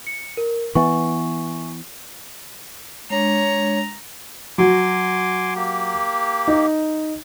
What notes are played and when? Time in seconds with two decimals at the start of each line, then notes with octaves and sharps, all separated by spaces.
0.07 C#7
0.37 A#4
0.75 E3 B3 E5 G#5 C#6
3.10 G#3 D4 C#5 A#5
4.58 F#3 F#4 G#5 C6 D6
5.56 A#3 G4
6.48 D#4